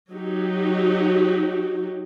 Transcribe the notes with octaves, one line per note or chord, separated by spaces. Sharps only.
F#3 D#4 F#4 G4